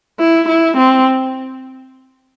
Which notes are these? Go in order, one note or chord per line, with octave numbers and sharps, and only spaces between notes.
E4
E4
C4